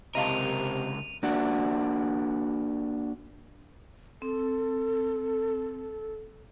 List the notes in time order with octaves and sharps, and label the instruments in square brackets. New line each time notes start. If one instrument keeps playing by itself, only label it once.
[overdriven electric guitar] C#2 A#4 [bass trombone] C3 [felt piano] D#5 F5 A5 [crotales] D#7 F7
[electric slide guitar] A#3 D4 F#4
[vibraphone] C4 [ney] A4